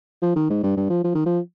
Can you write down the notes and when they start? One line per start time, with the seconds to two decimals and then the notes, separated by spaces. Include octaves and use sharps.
0.22 F3
0.36 D#3
0.50 G#2
0.63 G2
0.77 G2
0.90 F3
1.04 F3
1.15 D#3
1.26 F3